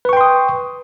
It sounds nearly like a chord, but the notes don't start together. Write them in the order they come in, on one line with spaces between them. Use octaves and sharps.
B4 C#6 G5 C6 D#6